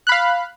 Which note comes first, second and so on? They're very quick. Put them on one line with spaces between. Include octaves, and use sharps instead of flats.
F#6 B5 F5